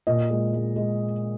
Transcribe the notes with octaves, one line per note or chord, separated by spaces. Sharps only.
A#2 D#5
G#3
G#3
G#3